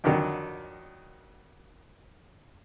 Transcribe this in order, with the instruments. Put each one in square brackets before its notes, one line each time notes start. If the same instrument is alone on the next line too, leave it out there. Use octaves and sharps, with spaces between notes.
[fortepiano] F2 D3 D#3 F#3